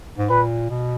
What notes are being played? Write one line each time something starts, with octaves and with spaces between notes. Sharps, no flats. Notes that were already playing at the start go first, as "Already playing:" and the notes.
G#2
A#2 B4
B2